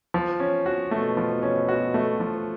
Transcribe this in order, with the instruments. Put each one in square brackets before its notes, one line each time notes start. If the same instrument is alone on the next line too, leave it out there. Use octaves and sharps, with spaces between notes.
[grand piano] F3
C#4
F#4
[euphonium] B2 [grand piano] A3
[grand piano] F3
C#4
F#4
A3
F3